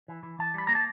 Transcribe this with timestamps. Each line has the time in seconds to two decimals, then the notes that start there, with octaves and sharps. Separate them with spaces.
0.08 E3
0.23 E3
0.39 E3 A5
0.54 G3 B5
0.67 A#3 A#5
0.75 A5